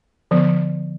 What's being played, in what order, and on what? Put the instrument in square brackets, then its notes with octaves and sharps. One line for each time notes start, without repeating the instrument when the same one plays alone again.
[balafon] D3 F3 B3